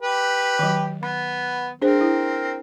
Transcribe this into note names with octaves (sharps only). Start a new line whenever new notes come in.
G4 B4
D#3 F#3
B3 B5
C4 D4 G#4 A#4 C5
E4